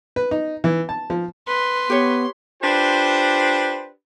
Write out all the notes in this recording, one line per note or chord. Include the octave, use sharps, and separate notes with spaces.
B4
D#4
E3
A5
F3
B4 C6
B3 G4 C#5
D4 F4 G4 B4 C5